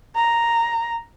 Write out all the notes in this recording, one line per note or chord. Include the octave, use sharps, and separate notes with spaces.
A#5